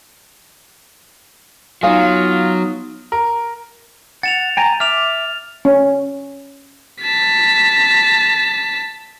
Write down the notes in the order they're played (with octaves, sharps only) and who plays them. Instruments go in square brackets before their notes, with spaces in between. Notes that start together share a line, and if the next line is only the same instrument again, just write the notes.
[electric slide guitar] F#3 [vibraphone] B3 D#4 D#6 [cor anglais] F4 [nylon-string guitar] C#5 F5 G#5
[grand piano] A#4
[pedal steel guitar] F#5 [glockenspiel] A6 E7 F7
[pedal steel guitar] G5 G#5 A#5
[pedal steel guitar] E5 D6 [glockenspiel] F6 E7 F7
[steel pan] C#4
[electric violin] A5 B6